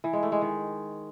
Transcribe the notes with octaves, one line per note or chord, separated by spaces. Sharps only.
E3
G#3
A3
G#3
D#3